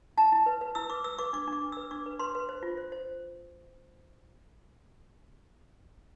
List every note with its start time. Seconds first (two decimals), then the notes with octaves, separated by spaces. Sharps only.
0.18 E4 A5
0.32 E4
0.46 B4
0.61 B4
0.75 E4 E6
0.89 B4 D6
1.04 B4 E6
1.18 B4 D6
1.33 D4 D6
1.48 D4 D6
1.62 B4
1.72 B4 E6
1.91 D4 D6
2.06 B4
2.19 B4 C6
2.35 B4
2.49 C5
2.63 F4
2.77 C5
2.92 C5